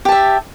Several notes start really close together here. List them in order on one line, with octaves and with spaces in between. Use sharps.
G4 A5 E5